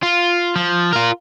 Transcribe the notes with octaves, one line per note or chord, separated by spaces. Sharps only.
F4
F3
F4 A#4